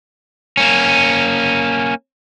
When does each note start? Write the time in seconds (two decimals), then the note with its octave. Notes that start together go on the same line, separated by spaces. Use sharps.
0.57 A#3 C#4